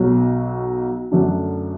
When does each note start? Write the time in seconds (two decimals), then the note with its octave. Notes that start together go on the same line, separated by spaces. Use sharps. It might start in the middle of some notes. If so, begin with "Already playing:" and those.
Already playing: B1 B2 F#3
1.12 F#2 D3 F#3 A3 D4